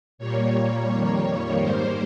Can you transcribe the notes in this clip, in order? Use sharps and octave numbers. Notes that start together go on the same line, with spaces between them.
A#2 G3 A#3 C#5
F2 D#3 G3 A#3
G#2 G3 A#3 C5